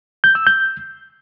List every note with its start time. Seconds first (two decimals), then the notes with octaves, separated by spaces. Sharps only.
0.24 G6
0.35 E6
0.47 G6